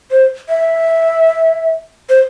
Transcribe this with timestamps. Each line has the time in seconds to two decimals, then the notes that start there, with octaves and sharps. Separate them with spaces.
0.11 C5
0.49 E5
2.09 C5